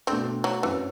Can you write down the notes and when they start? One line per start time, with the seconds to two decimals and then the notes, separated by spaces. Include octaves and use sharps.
0.07 B2 A3 C4 D4
0.44 F#3
0.62 F#2 E3 F#3 C4